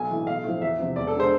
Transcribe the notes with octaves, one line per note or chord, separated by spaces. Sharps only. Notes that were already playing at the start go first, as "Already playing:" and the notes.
Already playing: B1 G#5
A2 E3
B1 F5
A2 F3
E2 E5
C3 F3
E1 D5
A4
D3 G#3 C5